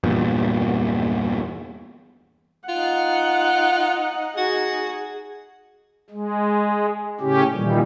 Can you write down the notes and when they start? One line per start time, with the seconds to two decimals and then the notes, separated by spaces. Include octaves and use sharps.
0.04 E2 G2 A#2
2.69 D#4 F4 F#5
4.37 F#4 G#4
6.10 G#3
7.20 A2 C#3 C#4 G4
7.54 A#2 D#3 E3 G3